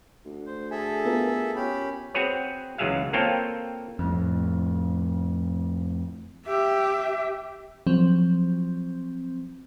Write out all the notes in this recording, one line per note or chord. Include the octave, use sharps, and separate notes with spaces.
D2
C5
G#4 A4 E5 G#5
B3 F4 A#4
C#4 G4 B5
C4 F#4 G#4 B4 C#5
C#2 E3 F#3 G#4 E5 F5
A#3 C4 F4 A4 C#5 G5
F2 A2
G4 E5
F3 F#3 C4